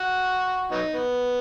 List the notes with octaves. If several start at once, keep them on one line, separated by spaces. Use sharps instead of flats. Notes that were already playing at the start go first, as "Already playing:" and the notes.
Already playing: F#4
F#3 B3 D#4
B3